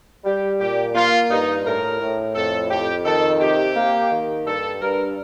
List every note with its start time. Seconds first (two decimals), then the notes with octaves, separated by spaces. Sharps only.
0.25 G3 G4
0.59 A#2 G4
0.94 A#3 F4
1.30 G2 D#4
1.65 A2 A#4
2.00 A2
2.35 F2 A4
2.70 F2 G4
3.05 D#3 A4
3.40 C3 G4
3.76 A#3
4.11 D#3
4.46 G2 A4
4.81 G2 A#4